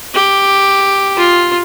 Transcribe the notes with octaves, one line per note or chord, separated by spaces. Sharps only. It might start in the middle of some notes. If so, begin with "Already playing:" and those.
G4
F4